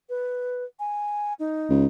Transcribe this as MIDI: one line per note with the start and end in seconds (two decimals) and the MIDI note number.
0.09 0.64 71
0.79 1.33 80
1.39 1.87 63
1.70 1.86 37